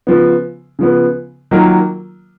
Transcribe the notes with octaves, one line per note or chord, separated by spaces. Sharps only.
C#3 F3 B3
C#3 F3 B3
D#3 F#3 A#3 F4 A#4